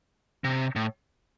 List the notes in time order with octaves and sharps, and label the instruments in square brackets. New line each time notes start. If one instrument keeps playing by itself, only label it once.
[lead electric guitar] C3
A2